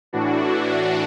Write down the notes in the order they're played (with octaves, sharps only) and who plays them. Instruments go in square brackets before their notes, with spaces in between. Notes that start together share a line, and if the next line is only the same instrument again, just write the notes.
[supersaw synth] A2 E3 D4 F#4